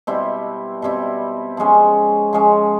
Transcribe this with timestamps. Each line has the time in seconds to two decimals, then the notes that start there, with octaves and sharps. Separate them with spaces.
0.07 B2 G3 C4 E4
0.82 B2 G3 C4 E4
1.57 F3 G#3 C#4
2.33 F3 G#3 C#4